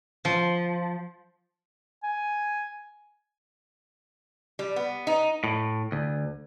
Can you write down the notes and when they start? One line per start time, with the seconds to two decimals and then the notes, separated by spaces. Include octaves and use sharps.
0.25 F3
2.03 G#5
4.59 G3
4.76 B3
5.07 D#4
5.44 A2
5.92 D2